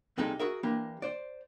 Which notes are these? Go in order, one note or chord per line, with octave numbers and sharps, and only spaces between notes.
C#2 C3 G3 G#3 D#4 A4
F#4 G#4 A#4 E5
E3 A#3 D4 G4
C5 D5